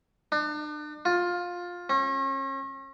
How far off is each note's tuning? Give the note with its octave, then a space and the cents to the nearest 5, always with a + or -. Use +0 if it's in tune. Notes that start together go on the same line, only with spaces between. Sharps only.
D4 +40
F4 +15
C#4 -40